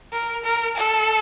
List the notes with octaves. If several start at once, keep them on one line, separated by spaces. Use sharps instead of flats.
A#4
A#4
A4